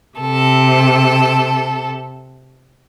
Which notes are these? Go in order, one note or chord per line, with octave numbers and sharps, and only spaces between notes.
C3 A4